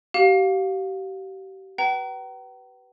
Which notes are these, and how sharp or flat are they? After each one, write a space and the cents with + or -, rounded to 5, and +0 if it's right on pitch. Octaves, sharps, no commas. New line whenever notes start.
G4 -35 F5 +20
B4 +0 G5 -45 A#5 +0